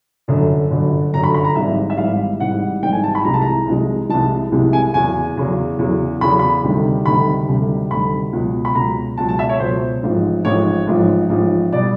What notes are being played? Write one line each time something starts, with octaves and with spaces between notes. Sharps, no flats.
G1 F#2 D3 F#3
G1 F#2 D3 F#3
G1 F#2 D3 F#3 A#5
B5
B5
A#5
G#1 G#2 E3 G3 E5
E5
G#1 G#2 E3 G3 F5
G#1 G#2 E3 G3 F#5
G#1 G#2 E3 G3 G5
G#5
A5
B5
C2 C3 E3 G#3 A#5
A5
A#5
C2 C3 E3 G#3
C2 C3 E3 G#3 A5
C2 C3 E3 G#3
G#5
E2 C#3 F#3 G#5
E2 C#3 F#3
E2 C#3 F#3
E2 C#3 F#3 B5
B5
D2 C3 D#3 G3
D2 C3 D#3 G3 B5
D2 C3 D#3 G3
D2 C3 D#3 G3 B5
C#2 B2 F#3
B5
C#2 B2 F#3 A#5
C#2 B2 F#3 A5
A5
E5
C#5
C#2 B2 F#3 C5
A1 G#2 F3
A1 G#2 F3 C#5
A1 G#2 F3
A1 G#2 F3
B2 G3 D5